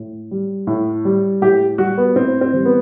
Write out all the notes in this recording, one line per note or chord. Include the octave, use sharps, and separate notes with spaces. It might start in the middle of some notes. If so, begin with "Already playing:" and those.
Already playing: A2
G3
A2
G3
A2 G4
G3 F#4
B3
A2 C4
C4
E3 G3
B3